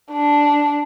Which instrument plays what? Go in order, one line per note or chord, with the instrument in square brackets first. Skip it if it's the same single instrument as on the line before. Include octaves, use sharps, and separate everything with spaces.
[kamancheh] D4